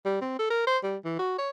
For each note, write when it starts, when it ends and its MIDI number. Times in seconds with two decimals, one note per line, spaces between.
0.05 0.19 55
0.21 0.38 60
0.39 0.46 69
0.50 0.66 70
0.67 0.78 72
0.83 0.96 55
1.05 1.19 52
1.19 1.36 66
1.38 1.50 73